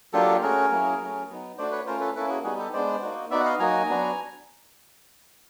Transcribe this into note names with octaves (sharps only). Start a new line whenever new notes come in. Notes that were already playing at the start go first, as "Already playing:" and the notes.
F#3 A#3 D4 F4 G4 A4
A3 C#4 F#4 G#4 A#4
F#3 A#3 C#4 E4
F#3 A3 C#4
F#3 B3 D#4
A3 D4 F#4 C5 D5
B4 C#5
A3 C#4 F4 A#4 C5
A4 B4
A#3 C#4 E4 A4 B4
F#4 G#4
G3 B3 D#4 F#4 G#4
G4 A4
G#3 B3 D4 C5 D5
A#3 D#4 F#4
B3 D#4 F#4 D5 E5
F#5
D#5 F5
F#3 A#3 D#4 F#4 G#5 A#5
F#3 B3 D4 F#4